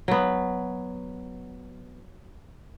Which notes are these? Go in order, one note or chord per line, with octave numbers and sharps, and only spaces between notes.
F#3 B3